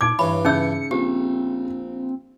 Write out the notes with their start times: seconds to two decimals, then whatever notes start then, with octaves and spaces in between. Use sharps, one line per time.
0.01 A#2 D#4 D6 G#6 D7
0.19 G2 E3 C#5 B5
0.45 C#3 C#4 D#4 E5 E6 G6 C#7
0.91 A#1 C4 G4